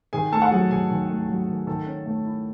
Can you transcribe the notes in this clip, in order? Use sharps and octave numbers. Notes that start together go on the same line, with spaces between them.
D#3 G#4 G#5
A3 A4 A5
F#5
F#3 G#4 G#5
D#3 G#4 G#5
D#3
A3
F#3
D#3
D#3 A4 A5
C#4
A3
E4